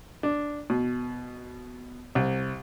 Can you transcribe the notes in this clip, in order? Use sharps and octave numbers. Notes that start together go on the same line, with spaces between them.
D4
B2
C2